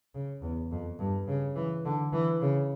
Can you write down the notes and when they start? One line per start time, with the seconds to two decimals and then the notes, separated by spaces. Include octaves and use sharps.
0.15 C#3
0.42 E2
0.71 F2
0.99 G2
1.28 C#3
1.56 E3
1.85 D3
2.13 E3
2.42 C#3